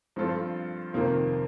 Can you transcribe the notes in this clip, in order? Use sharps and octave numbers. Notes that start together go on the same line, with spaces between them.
G2 F3 C4 F4 A4
F2 C3 D#3 A#3 F4